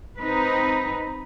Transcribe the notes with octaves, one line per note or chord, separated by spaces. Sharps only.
C4 D#4 B4